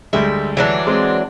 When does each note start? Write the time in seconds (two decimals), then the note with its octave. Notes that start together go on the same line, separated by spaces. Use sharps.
0.13 D2 G3 G#3 E5
0.57 E3 F#3 D4
0.87 G#3 C4